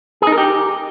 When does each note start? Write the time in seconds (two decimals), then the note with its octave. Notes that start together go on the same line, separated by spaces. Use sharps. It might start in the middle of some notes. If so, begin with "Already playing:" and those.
0.22 G#4
0.27 D#4
0.32 A#4
0.38 G4